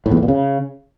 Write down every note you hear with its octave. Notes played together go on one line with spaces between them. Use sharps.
A2
E2
A2
A#2
C#3